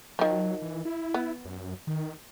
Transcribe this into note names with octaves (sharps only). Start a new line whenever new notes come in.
D#3 F3 F#3
E3
E4
B3
F#2
D#3